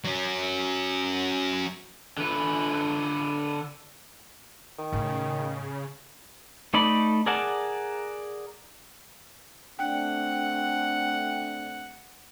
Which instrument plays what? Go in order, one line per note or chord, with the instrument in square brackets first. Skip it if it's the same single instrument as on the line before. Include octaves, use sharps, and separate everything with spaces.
[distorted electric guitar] F#3 C#4
[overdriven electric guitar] D3 B4
[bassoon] D#3
[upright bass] A2 A#3 [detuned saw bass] C#3
[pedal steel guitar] A3 D#4 A4 D5 B5
G#4 A#4 D5 F#5 A5
[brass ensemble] A3 C4 D4 [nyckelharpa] F#5 [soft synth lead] G5